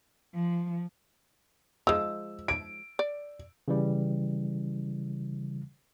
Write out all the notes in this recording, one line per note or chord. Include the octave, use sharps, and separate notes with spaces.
F3
F3 G#3 E6
D7
D5
C#3 E3 G3